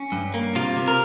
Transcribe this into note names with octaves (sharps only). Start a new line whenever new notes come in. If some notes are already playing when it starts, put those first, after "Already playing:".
Already playing: C#4
G2
A#3
C3 F4
C3
A#4